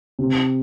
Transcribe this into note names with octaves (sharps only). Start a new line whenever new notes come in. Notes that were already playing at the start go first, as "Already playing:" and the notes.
C3